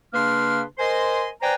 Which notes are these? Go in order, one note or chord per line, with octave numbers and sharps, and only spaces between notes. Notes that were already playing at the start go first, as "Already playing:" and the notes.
C#3 A#3 D4 B4 C6 F6
A#4 C5 D#5 G#5 C6
B4 C5 D5 G5 G#5 A#5